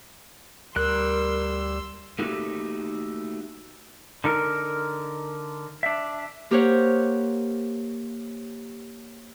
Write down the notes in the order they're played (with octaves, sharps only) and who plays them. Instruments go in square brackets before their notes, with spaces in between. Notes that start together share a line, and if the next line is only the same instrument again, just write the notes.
[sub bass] D2 [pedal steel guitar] G3 F#6 [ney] A#4 [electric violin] C6 E6
[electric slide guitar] A3 A#3 D#4 F#4 G4 A4
D3 D#4 A#4
D4 E5
[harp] A#3 G4 A#4 C5 C#5 F#5